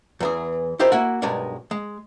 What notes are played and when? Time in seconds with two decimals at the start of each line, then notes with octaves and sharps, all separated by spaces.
0.20 E2 E3 G#4
0.79 E4 F4 G4 A#4 C5 D#5
0.92 A#3 E4 F#4
1.22 B1 G2 G#3 A#4 D5
1.71 G#3